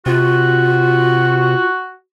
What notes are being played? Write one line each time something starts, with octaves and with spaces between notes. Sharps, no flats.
C3 F4 F#4